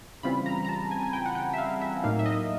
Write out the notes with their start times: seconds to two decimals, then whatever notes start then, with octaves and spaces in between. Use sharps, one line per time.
0.23 C#3 E3 G3 C4 F4 B5
0.46 A#5
0.65 A#5
0.69 A5
0.91 G#5
1.03 G#5
1.13 G5
1.26 F#5
1.35 G5
1.53 E5
1.58 F5
1.81 E5
2.04 A2 F#3 A#3 D#4 F5
2.19 E5
2.26 D#5